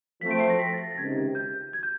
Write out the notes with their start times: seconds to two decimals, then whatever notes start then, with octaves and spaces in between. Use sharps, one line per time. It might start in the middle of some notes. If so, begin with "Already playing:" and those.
0.21 F3 A3 C4 B6
0.31 D7
0.40 C7
0.50 A#6
0.59 B6
0.73 A6
0.78 A#6
0.91 A6
0.97 C#2 C3 D#3 G#6
1.35 G6
1.73 G#6
1.83 G6